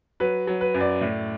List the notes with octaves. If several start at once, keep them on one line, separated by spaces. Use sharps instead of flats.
F#3 B4
F#3
B4
F#2
D5
A2